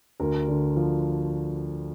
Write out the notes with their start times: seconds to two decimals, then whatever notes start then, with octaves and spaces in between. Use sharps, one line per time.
0.20 D2 A#4
0.48 D3
0.76 F3